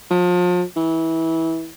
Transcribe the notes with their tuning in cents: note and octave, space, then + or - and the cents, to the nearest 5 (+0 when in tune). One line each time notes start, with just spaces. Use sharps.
F3 +35
E3 -20